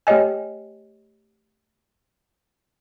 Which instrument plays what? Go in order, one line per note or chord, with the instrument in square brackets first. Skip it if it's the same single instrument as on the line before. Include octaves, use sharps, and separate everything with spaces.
[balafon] A3 G4 C#5 D#5 G#5